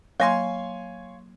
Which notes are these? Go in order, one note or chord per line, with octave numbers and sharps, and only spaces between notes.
F#3 A#3 C#5 F5 G#5 C6